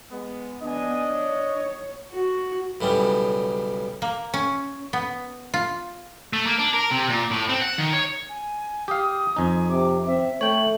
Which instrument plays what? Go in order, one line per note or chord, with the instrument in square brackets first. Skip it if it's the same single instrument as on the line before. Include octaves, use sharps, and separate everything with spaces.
[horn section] G#3 B3
[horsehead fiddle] B3 G#5 [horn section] D4 [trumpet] D#5
[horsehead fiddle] C#5
[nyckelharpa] F#4
[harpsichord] B1 A2 C#3 G3
[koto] A#3
C#4
B3
F4
[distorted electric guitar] A3
A#3
D4
A#4
C3
A#2
A2
C4
F#5
D#3
C#5
[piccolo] G#5
[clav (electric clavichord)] G4 F5 [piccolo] D#6
[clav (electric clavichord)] F2 D#4 [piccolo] G#5
[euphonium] C3 [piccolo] D6
[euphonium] C4 [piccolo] E5
[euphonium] A3 [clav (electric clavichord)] C#5 G5 [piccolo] F#7